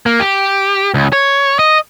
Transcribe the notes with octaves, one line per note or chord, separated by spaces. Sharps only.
A#3
G4
C#2
C#5
D#5